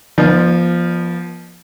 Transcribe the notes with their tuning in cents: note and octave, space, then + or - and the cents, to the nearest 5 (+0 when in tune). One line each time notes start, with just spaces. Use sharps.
F3 -10 B3 -40 D5 +45